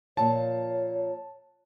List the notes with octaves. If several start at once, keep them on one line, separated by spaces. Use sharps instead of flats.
A#2 F3 C#5 A5